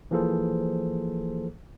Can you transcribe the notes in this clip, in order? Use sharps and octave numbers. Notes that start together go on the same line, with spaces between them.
E3 F3 A#3 G#4 A4 C5